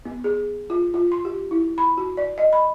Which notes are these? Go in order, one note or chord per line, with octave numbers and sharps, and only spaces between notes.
B3
G#4
F4
F4
C6
G4
E4
B5
F#4
D5
D#5
B5